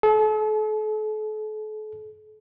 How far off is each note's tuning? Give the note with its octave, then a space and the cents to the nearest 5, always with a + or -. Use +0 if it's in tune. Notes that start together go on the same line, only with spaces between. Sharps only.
A4 -40